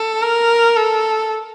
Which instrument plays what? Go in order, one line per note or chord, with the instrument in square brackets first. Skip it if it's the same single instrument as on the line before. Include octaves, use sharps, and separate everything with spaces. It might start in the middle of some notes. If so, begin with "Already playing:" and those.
Already playing: [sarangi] A4
A#4
A4